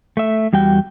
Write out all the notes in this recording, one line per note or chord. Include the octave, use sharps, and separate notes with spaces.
A3 E5
E2 G3 F#4 G5